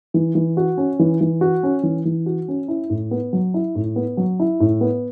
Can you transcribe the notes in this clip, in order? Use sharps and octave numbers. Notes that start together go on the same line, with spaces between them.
E3
E3
F#4
C#4
E3
E3
F#4
C#4
E3
E3
F#4
C#4
E4
A2
B3
F#3
E4
A2
B3
F#3
E4
A2
B3